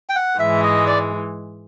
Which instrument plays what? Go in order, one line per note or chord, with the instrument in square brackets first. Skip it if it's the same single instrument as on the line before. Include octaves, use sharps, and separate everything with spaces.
[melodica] G5
F#5
[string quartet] G#2 E3 G#3 [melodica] E5
[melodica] D#5
D5